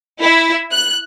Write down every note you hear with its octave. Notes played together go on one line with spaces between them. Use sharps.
E4
F#6